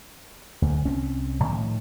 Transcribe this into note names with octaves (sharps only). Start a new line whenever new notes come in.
D2
C2 C4 C#4
A2 D#3 F3